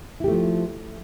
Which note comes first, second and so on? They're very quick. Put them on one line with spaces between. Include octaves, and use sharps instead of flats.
E4 G4 A3 F3